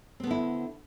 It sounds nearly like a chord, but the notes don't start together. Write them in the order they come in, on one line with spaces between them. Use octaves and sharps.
C4 B3 D3 E4